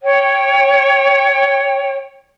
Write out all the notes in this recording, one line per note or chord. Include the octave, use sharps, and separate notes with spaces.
C#5 G5